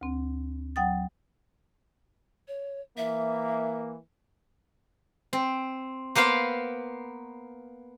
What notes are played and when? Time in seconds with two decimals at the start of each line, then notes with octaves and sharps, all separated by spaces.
0.01 D2 C4
0.76 F#3 F#5 G5 D#6 A6
2.48 C#5
2.97 E3 A#3 E5
5.33 C4
6.15 A#3 B3 C5 F5 C6